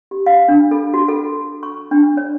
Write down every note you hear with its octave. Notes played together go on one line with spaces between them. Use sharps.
G4
F5
D4
A4
F#4
A4
C#6
D4
C#5